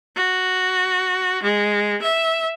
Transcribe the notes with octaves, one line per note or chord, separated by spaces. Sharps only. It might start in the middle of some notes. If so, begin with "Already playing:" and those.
F#4
G#3
E5